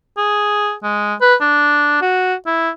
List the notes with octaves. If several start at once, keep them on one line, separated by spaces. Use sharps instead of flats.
G#4
G#3
B4
D4
F#4
E4